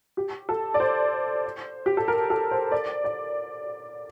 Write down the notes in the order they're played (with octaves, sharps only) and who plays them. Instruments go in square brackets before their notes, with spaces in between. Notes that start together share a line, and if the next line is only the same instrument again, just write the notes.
[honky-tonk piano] G4
A4
D5
C5
G4
A4
A#4
A4
C5
D5
D5